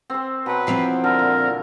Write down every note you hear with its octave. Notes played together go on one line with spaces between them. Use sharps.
C4 C5
B2 F#3 B4 F#5
E3 F3 C4 B5
D3 A#4 B5
A#2